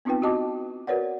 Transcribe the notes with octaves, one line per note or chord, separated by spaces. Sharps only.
B3 C4 D#4 F4 B4 G5
E4 F#4 G4 D#5 A5 D6
F#4 A#4 B4 C#5 D5 F#5